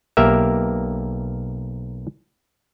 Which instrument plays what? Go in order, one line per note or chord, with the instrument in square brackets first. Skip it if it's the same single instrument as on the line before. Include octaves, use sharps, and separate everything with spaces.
[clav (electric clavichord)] B1 A#3 G4 A#4 E5